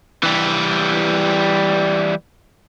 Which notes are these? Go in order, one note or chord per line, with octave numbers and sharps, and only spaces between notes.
E3 G3